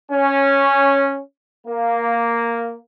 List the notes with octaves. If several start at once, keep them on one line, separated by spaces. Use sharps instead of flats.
C#4
A#3